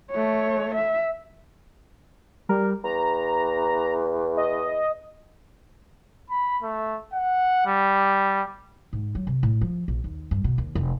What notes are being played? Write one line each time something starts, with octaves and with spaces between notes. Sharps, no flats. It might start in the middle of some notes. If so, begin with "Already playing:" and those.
A3 C#5
E5
G3 A#4
E2 A#5
D#5
B5
A3
F#5
G3
G#2
F#3
C3
A2
F3
A#1
D#2
G2
B2
D#2
F1